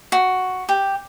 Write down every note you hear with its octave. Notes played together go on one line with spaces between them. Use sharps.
F#4
G4